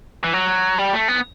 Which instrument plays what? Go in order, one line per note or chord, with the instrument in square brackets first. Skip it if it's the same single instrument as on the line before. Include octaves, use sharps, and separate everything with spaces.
[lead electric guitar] E3
F#3
G3
A3
B3